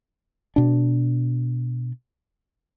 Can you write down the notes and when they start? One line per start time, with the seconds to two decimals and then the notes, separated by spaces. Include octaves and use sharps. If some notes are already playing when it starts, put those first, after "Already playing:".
0.56 B2 D4